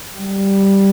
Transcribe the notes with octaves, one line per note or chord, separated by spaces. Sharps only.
G3